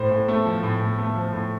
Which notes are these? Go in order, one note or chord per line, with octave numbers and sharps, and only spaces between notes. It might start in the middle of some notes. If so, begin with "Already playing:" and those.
Already playing: A2 C5
A2
A3
F3
A2
A2
A3
F3
A2